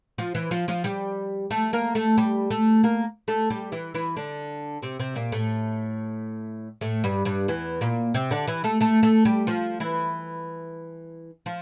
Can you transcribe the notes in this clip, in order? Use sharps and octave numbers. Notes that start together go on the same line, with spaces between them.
F3 F4
E3 E4
F3 F4
F3 F4
G3 G4
A3 A4
A#3 A#4
A3 A4
G3 G4
A3 A4
A#3 A#4
A3 A4
G3 G4
E3 E4
E3 E4
D3 D4
C3 C4
C3 C4
A#2 A#3
A2 A3
A2 A3
G2 G3
G2 G3
E2 E3
A#2 A#3
C3 C4
D3 D4
E3 E4
A3 A4
A3 A4
A3 A4
G3 G4
F3 F4
E3 E4
F3 F4